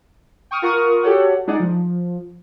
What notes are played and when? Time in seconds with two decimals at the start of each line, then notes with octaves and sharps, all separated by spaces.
0.51 G5 C#6 D#6 F6
0.62 F4 A#4 F#5 C#6 D#6 F6
1.03 F#4 G4 A4 C#5 F#5
1.47 G#3 D4 D#4 G#4 D5 F#5
1.60 F3